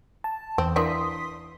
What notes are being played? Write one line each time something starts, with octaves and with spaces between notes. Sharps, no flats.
A5
E2 C4
E3 A#3 D4 C6 D#6 B6